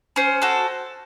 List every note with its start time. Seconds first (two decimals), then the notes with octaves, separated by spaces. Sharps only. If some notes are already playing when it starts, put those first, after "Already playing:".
0.16 C#4 C5
0.42 F#4 A4